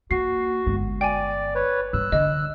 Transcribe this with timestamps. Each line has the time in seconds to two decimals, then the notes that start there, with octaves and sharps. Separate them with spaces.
0.11 A#3 F#4 C7
0.67 G1 G#3
1.01 D5 G5 G#5
1.55 B4 C#5
1.93 G2 E6 F#6
2.12 D3 D#5